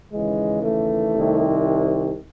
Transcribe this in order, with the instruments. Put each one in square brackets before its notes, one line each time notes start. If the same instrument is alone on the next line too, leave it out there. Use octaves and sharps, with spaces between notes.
[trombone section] D#2 C#3 E3 G#3
A3
C2 C3 D#3